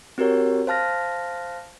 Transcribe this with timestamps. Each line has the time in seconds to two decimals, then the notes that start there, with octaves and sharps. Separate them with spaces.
0.18 C4 F#4 G4 A#4 C#5
0.67 C5 F5 A5 F6 A#6